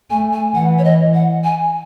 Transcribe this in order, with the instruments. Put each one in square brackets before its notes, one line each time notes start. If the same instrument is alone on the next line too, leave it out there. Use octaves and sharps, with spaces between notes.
[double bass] A3 [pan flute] G#5
[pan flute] G#5
[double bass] E3 [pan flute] F#5
[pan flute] C#5
D#5
F#5
G#5